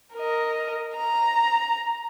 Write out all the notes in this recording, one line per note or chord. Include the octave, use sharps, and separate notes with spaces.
A#4 D#5
A#5